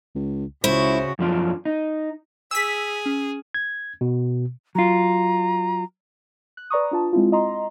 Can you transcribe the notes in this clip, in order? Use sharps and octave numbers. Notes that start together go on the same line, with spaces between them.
C#2
C#2 C#3 E4 F#4 C5
F#2 F3 D4
D#4
G#4 E6 B6
C#4
G#6
B2
F#3 F4 A#5
F#6
B4 D5 A#5 C#6 D#6
D4 F4 A5
G#3 C4 E4 F4
D#5 A#5 C6